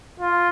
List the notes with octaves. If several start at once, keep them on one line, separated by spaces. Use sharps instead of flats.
F4